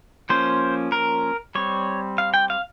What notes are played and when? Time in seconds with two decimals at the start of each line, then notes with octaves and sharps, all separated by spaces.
0.29 F3 A#3 C#4 C5
0.92 A#4
1.55 G3 C4 C#5
2.18 F5
2.34 G5
2.50 F5